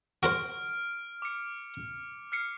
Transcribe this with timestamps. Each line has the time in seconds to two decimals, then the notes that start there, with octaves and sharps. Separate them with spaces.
0.23 F#4 A#4 C5 F6 D7
1.22 D6 C#7
2.32 F6 C7 C#7